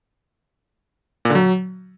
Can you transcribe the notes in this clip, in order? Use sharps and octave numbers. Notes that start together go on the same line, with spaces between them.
A#2
D3
F#3